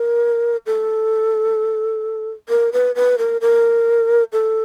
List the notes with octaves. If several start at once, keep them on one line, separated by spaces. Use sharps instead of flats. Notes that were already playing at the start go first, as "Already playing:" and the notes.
Already playing: A#4
A4
A#4
B4
B4
A#4
A#4
A4